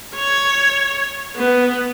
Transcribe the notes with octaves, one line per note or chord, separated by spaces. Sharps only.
C#5
B3